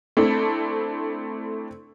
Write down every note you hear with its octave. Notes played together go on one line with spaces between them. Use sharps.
A3 C4 D4 E4 A4